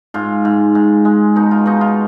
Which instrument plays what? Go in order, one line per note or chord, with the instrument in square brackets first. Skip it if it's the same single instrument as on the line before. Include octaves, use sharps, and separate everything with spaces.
[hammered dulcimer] G#2 F4
G#2
G#2
G#3
B2 D#4
F4
B2 D#4
F4